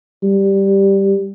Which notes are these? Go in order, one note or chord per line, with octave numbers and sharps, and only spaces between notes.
G3